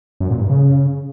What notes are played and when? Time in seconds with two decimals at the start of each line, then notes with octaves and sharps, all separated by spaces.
0.20 F#2
0.30 A#2
0.40 G2
0.50 C#3